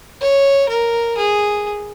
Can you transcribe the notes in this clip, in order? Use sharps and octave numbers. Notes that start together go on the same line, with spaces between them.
C#5
A#4
G#4